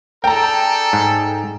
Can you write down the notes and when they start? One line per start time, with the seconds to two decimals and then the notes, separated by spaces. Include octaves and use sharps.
0.24 D4 G#4 A4 G5 A#5
0.93 G#2